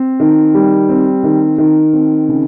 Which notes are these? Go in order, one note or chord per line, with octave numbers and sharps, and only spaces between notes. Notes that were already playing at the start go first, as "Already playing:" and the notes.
Already playing: C4
D#3
G3
C4
D#3
D#3
C4
C#3